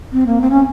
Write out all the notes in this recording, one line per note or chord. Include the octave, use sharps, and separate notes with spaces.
C4
A#3
C4
C#4